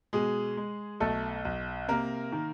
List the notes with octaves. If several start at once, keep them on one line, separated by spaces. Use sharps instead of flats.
B2 G#3 G#4
G#3
B1 A3 A4
B1
C3 A#3 A#4
D#3